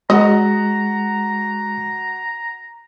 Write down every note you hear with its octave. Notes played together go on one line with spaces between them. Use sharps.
G#3 F#4 D#5 A#5